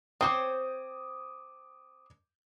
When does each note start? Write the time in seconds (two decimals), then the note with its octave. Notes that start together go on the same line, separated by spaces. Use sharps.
0.21 C4 C5 C#5 D6 D#6